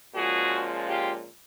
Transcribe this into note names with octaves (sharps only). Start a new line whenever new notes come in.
A#2 F3 G#3 C#4 F#4 G#4
F4 G4